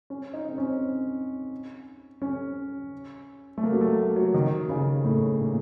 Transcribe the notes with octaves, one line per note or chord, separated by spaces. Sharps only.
C#4
D#4
C4
C#4
C#4
A3
A#3
F#3
A3
A3
F#3
D#3
C#3
A2
A#2